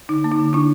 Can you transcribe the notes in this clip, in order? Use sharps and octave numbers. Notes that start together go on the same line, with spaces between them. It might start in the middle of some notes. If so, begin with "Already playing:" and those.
D3 D#4
A#3
D#4
D3
D3 D4 E4